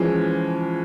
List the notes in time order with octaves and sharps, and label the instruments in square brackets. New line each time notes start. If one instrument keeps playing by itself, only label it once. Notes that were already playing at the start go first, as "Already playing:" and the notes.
Already playing: [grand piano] E3 G#3 C#4 [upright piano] F3